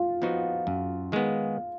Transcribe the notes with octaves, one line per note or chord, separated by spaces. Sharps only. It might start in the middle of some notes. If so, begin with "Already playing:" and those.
Already playing: F4
F3 B3 D#4 F#4
F#2
D#3 G#3 B3